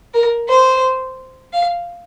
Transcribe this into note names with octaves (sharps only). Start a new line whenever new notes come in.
A#4
C5
F5